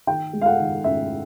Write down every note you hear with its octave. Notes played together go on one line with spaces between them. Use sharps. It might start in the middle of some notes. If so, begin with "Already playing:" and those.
D#3 G5
G#3
F5
F#5
D#3
C#4 E5